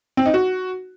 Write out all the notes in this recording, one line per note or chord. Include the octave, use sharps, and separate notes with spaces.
C4
D#4
F#4